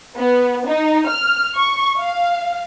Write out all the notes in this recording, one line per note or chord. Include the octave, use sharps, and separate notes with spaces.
B3
D#4
F6
C#6
F5